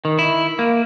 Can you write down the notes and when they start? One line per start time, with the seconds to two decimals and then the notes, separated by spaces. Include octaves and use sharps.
0.05 D#3
0.19 E4
0.59 A#3